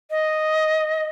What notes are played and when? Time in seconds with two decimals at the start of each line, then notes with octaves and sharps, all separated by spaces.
0.10 D#5